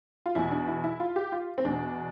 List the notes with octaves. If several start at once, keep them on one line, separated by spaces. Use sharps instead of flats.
F4
E2 B2 E4
D4
E4
E4
F4
G4
F4
C4
E2 B2 D4